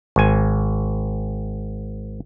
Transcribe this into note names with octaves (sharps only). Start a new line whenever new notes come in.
G#1 G#5